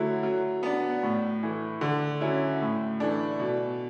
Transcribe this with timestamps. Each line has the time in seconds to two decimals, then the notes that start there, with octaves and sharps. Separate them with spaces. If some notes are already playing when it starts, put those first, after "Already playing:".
Already playing: D3 F#3 A3 E4
0.23 F#3
0.63 B3 D4
1.03 A2
1.43 E3 A3
1.81 D3
2.21 F#3 C#4 E4
2.61 A2
3.00 E3 A3 D4
3.40 B2